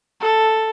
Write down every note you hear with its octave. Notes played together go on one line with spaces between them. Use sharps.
A4